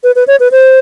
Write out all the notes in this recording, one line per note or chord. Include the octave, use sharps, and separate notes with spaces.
B4
B4
C#5
B4
C5